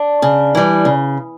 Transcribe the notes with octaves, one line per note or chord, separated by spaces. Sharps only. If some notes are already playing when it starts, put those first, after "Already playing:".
Already playing: D4
C#3
E3 G3
C#3